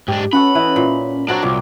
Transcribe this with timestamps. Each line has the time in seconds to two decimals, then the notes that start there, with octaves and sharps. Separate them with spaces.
0.08 G#2 D4 G4
0.33 B3 C#4 F#4 A4 B5
0.55 E3 D#5
0.76 A#2
1.28 F#3 C4 D4 F#4 A#5
1.43 C2 A#2 D6